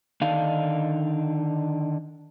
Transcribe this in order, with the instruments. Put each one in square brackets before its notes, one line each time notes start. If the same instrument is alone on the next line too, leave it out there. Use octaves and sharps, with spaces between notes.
[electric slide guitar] D3 D#3 D4 D#4 F5